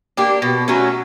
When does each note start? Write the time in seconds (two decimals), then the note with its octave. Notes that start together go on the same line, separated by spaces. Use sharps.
0.17 A#3 D4 G4
0.42 B2
0.68 F#3 A3 C#4